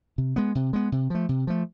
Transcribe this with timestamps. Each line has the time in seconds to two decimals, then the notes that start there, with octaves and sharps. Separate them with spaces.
0.18 C3
0.36 G#3 B3
0.55 C3
0.73 G#3 B3
0.92 C3
1.10 F3 A3
1.29 C3
1.47 F3 A3